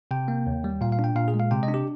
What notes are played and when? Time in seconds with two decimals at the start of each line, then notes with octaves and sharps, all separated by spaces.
0.11 C3 G5
0.28 A#3
0.47 D#2
0.64 G3
0.81 A#2 F5
0.92 F5
0.99 D4
1.04 G5
1.16 A#2 F5
1.28 G#4
1.34 G#3
1.40 F5
1.51 C3 G5
1.63 D#5
1.68 D4
1.74 G4